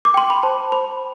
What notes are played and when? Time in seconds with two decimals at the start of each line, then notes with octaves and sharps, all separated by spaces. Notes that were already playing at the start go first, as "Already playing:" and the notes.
0.05 D6
0.14 G5 C6
0.30 B5
0.43 C5 A5
0.72 C5 B5